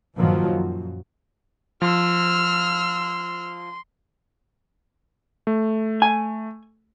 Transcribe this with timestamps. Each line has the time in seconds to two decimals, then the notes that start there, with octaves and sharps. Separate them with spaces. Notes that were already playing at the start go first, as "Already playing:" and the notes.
0.16 G2 A#2 D#3 F3 F#3
0.46 F#2
1.82 F3 C6 E6 F6
5.47 A3
6.02 G#5